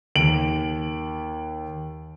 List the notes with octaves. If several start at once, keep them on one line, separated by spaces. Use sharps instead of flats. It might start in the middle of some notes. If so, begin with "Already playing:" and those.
D#2 D7 F#7